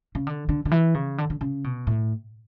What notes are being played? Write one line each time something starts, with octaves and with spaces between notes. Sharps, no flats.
C#3
D3
D3
D3
E3
C#3
D3
D3
C#3
B2
A2